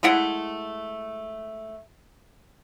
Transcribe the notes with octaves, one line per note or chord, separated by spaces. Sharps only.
G#3 A3 E4 F#5